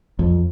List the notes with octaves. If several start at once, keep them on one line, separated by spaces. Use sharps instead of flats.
F2